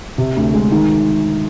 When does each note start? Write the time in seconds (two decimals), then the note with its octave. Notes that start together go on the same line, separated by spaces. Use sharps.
0.18 C3
0.36 D2
0.54 G#3
0.72 D#3